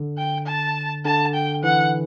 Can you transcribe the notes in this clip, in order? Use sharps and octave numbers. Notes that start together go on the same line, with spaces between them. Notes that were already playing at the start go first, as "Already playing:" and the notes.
Already playing: D3
G5
A5
D3 A5
G5
E3 F#5